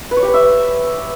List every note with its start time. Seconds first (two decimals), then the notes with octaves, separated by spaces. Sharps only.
0.11 B4
0.17 C#5
0.22 G4
0.28 B4
0.34 E5